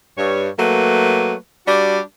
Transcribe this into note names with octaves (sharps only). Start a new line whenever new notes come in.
G2 C#5
F#3 A3 A#3 B4
G3 D4 F#4 G4